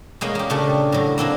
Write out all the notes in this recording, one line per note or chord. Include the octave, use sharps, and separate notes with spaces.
B2 G#3 A#3 C#4
A#3 G4
A#2 C#3 A3 D4 G4
A2 F#3
A#3 C4 D4 E4